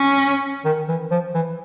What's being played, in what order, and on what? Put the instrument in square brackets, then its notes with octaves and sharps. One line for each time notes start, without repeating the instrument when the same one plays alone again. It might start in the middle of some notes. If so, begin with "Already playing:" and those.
Already playing: [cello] C#4
[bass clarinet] D#3
E3
F3
E3